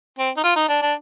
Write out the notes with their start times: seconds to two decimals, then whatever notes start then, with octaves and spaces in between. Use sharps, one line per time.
0.18 C4
0.37 D#4
0.44 F4
0.56 D#4
0.68 D4
0.82 D4